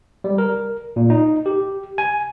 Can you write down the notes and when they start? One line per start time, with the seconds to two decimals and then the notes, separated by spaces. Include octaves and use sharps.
0.24 G3
0.38 A#4
0.96 A#2
1.10 D#4
1.46 G4
1.98 G#5